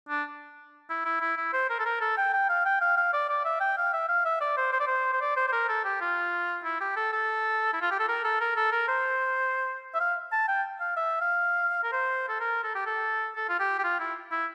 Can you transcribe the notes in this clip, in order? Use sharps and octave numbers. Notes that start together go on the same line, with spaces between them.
D4
E4
E4
E4
E4
C5
A#4
A4
A#4
A4
G5
G5
F5
G5
F5
F5
D5
D5
E5
G5
F5
E5
F5
E5
D5
C5
C5
D5
C5
C5
D5
C5
C5
A#4
A4
G4
F4
E4
G4
A4
A4
E4
F4
G4
A4
A#4
A4
A#4
A4
A#4
C5
E5
F5
A5
G5
F5
E5
F5
A#4
C5
A4
A#4
A4
G4
A4
A4
F4
G4
G4
F4
E4
E4